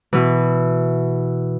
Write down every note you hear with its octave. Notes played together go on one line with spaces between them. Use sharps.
B2 E3